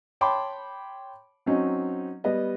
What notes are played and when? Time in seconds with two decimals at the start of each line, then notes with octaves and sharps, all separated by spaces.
0.21 C#5 G5 A5 B5 C6 D6
1.46 F#3 C4 C#4 D#4
2.24 G3 B3 D#5